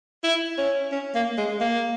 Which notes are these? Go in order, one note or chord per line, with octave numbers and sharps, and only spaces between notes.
E4
C#4
C#4
A#3
G#3
A#3